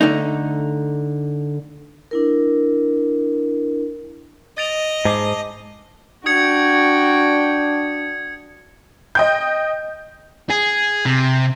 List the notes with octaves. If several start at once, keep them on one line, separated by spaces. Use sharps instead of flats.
D3 A3 D#4
D4 E4 A#4
D#5 A6 D7 F7
G#2 A5 D6 C7
D4 F#4 G5 D#6 G#6 C#7
D#5 G5 G6
G#4
C3